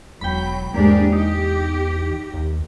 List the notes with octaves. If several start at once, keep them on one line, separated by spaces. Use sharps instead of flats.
E1 F#3 G5 B5
E2 G#2 G#3 A#3 D4 G4
D#4 G4
D#2